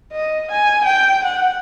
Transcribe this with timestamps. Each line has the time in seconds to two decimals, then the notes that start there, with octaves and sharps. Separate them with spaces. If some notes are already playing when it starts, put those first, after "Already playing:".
0.12 D#5
0.52 G#5
0.85 G5
1.25 F#5